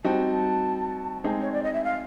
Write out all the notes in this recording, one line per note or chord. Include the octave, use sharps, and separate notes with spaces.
G3 C4 D#4 F#4 A5
G#3 C4 D#4 G#4
C#5
D5
D#5
E5
F5